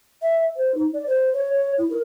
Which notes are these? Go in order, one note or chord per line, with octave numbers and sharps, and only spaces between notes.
E5
C5
D#4
D5
C5
C#5
C#5
E4
A#4